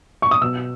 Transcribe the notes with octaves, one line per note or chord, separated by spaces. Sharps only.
C#6
D#6
B2 E6